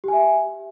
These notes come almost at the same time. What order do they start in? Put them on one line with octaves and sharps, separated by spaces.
G4 G#5 E5